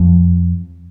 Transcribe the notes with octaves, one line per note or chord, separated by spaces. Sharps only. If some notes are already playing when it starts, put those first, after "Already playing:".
Already playing: F2 F3